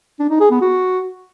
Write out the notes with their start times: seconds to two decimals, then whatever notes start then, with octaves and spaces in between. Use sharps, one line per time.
0.19 D4
0.30 D#4
0.40 G#4
0.51 B3
0.61 F#4